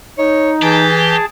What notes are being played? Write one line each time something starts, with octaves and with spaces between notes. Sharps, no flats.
D#4 C#5
E3 G4 G#4 A5